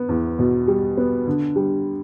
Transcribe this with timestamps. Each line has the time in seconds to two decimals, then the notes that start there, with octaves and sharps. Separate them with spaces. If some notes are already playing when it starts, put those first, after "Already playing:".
Already playing: B3
0.09 E2
0.39 B2
0.68 G3
0.97 B3
1.27 D3
1.56 G3